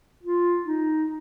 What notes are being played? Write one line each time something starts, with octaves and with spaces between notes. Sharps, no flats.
F4
D#4